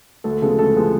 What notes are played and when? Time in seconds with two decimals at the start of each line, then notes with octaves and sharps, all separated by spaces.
0.24 D2 A4
0.42 C#3 F3 G#3 B3 A4
0.59 D2 A4
0.76 C#3 F3 G#3 B3